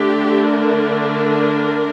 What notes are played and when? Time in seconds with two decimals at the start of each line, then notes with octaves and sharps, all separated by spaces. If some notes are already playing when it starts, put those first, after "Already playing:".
Already playing: D3 A3 D4 G4
0.48 A#4